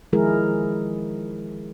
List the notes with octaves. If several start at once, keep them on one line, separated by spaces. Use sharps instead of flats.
D#3 F3 G#3 E4 G#4 A#4